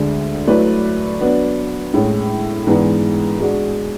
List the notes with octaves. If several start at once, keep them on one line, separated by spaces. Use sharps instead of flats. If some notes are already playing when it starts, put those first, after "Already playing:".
Already playing: D2 D3 G#3 D4
F#3 A3 E4 B4 D5
F#3 B3 D4
A2 G#3 C#4
G#2 E3 G#3 B3 D4
G#3 D4 F#4